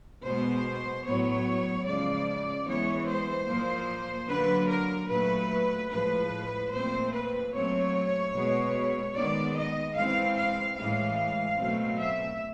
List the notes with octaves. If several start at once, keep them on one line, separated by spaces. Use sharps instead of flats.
B2 G#3 B3 C5
A2 F#3 B3 C#5
C#3 F3 G#3 D5
E3 G#3 B3 C#5
C5
A#2 F3 A#3
D3 F#3 A#3 B4
A#4
A#2 F#3 A3 B4
A2 F3 G#3 B4
A#2 F3 A3 C4 C5
B4
A#2 F#3 A3 C4 C#5
B2 G#3 B3
D#3 G#3 B3 D5
D#5
E3 G#3 C4 F5
F5
A2 E3 G#3 F5
B2 F#3 A3 C4
E5